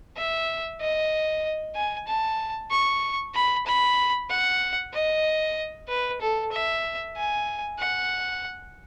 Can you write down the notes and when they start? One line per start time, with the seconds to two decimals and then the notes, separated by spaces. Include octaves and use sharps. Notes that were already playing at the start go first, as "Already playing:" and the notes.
0.17 E5
0.81 D#5
1.76 G#5
2.08 A5
2.71 C#6
3.35 B5
3.67 B5
4.30 F#5
4.94 D#5
5.88 B4
6.21 A4
6.53 E5
7.16 G#5
7.79 F#5